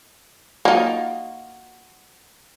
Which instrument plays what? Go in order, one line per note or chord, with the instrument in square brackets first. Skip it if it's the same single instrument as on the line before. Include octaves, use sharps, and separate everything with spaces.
[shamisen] A#3 D#4 [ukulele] F4 F#4